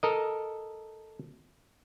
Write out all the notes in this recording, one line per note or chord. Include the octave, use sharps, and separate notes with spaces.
A4 A#4 D#5